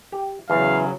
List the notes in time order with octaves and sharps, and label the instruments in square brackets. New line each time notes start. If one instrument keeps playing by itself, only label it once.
[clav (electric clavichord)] G4
[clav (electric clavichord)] E2 [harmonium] C#3 F#3 [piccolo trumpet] F5